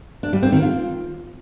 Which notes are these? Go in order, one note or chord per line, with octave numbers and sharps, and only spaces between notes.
D4
G3
C4
D#3
F4